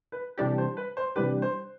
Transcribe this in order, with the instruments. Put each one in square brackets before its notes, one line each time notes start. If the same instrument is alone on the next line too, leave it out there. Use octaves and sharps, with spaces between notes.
[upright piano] B4
[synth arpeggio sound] C3 E3 G3 D4 G4 [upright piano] A4
[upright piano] C5
B4
C5
[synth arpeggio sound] C3 E3 G3 D4 G4 [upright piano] B4
[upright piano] C5